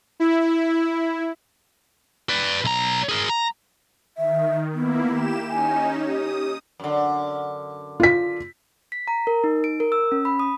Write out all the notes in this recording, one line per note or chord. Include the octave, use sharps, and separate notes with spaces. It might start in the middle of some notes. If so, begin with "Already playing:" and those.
E4
B4 D5
B1 A#5
G#4 A#4
A#5
D#3 E5
A#3 B3 E4
G4 E7
C#4 D#4 G#5
G4 D#6
F#2 D3
F4 B6
B6
A#5
A#4
D#4
D7
A#4
E6
C#4
B5
D#6